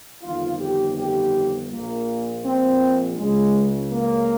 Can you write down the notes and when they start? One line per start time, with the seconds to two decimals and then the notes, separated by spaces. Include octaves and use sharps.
0.22 G1 F2 D#3 F4
0.59 G4
0.97 G4
1.71 A#1 A#2 A#3
2.44 C4
3.18 C#2 C#3 G#3
3.92 A#3